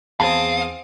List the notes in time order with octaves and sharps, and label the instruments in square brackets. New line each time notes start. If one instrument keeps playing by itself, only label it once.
[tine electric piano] E2 G#4 G#5 [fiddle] C4 D#6 [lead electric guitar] F5 [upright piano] A5